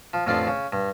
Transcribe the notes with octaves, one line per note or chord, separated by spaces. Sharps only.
F3
A1 F2 D3 F4 D5 C6
C#3
G2